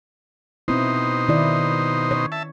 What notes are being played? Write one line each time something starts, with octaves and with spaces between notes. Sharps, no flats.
B2 C4 D#4 E4 C5
D#3 E4 D5
C#5
E5 A5